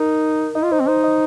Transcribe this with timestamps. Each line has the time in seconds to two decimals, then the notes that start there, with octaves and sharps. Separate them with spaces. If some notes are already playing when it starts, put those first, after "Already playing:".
Already playing: D#4 A#4
0.55 D#4 D#5
0.63 F4
0.72 D#4 C5
0.80 C4
0.88 D#4 C5
1.04 D#5